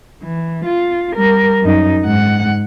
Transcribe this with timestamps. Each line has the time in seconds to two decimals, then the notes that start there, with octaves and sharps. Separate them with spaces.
0.23 E3
0.65 F4
1.15 G3 A#4
1.63 F#2 D#4
2.04 G#2 F#5